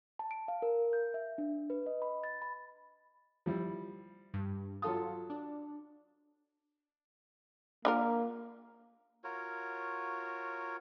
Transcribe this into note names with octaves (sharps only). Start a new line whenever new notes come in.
A5
D7
F5
A#4
G6
E5
D4
B4
D#5
B5
A6
B5
F3 G3 E4
G2
F#3 F4 A4 D#6
D4
A#3 D4 F4 A#4
F4 F#4 A#4 C#5